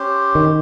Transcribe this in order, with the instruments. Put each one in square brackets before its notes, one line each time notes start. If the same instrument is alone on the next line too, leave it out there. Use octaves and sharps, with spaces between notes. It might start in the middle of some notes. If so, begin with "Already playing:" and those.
Already playing: [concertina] C#4 G4 C5
[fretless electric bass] D#3